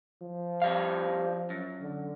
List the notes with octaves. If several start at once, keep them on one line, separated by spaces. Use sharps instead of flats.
F3
F2 G3 F5
F#2
D3